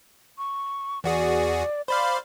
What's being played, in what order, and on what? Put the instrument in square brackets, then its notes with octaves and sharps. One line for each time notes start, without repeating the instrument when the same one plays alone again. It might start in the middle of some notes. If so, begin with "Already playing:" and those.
[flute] C#6
[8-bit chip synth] E2 F#4 G#4 [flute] D5
[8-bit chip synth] C5 D5 F5 [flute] B5